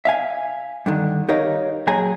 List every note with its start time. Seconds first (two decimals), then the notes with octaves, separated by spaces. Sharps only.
0.05 E5 F5 G#5
0.86 G2 D3 D#3
1.29 D#4 G4 A#4 C#5 D#5 F5
1.87 A#2 F#3 G#4 G#5 A#5